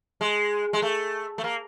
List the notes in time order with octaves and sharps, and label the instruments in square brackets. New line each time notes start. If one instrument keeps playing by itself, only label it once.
[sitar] G#3
G#3
A3
A3
A#3